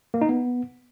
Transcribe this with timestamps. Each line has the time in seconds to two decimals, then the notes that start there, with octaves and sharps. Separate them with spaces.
0.14 A#3
0.21 D#4
0.29 B3